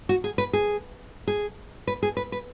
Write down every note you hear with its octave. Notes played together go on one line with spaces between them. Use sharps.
F#4
G#4
B4
G#4
G#4
B4
G#4
B4
B4